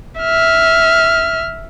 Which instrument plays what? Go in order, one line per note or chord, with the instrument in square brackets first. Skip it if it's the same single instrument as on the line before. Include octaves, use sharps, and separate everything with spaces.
[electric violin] E5 F6